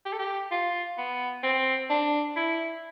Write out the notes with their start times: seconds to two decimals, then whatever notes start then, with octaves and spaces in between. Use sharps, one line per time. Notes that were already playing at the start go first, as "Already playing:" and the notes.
0.06 G4
0.12 A4
0.19 G4
0.52 F4
0.98 B3
1.43 C4
1.90 D4
2.36 E4